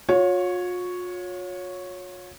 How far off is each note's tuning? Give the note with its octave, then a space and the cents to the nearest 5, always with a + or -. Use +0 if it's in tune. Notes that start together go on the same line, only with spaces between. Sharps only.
F4 +45 C#5 +0